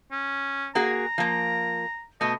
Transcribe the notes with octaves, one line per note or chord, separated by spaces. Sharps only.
C#4
A#3 F#4 G#4 A#5
F3 A#3
B2 A3 D#5